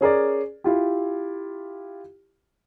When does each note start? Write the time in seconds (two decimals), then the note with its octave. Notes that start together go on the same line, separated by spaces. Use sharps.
0.01 C#4 G#4 A#4 D5
0.64 E4 F4 G4